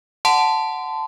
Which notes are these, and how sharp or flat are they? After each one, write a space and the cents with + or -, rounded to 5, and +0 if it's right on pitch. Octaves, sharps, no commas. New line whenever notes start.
F#5 +0 A5 +0 C6 -30